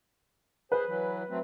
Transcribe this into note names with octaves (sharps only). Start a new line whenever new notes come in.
G#4 B4 C5
E3 F#3
F#3 A3 C4